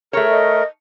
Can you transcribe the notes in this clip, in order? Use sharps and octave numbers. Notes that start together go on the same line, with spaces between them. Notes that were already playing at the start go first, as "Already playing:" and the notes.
A3 G#4 A#4 C#5
D#5